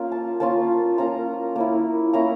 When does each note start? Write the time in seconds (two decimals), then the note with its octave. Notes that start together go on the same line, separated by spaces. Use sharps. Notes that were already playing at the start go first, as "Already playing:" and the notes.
Already playing: A#3 C#4 F4
0.12 A5
0.40 A#3 C#4 F4 A5
0.98 A#3 C#4 F4 A#5
1.56 A#3 C#4 E4
2.13 A#3 C#4 E4 A#5